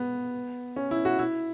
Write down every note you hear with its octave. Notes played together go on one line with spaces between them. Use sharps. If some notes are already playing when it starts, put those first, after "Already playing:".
Already playing: B3
C#4
E4
F#4
E4